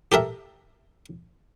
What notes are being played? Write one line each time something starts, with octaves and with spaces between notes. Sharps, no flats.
G4 A4 A#4 E5